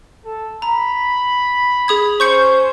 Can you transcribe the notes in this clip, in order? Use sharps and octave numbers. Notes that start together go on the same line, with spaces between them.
A4
A#5 B5
G#4 D#6 G#6
C#4 C5 C#6 G6 C#7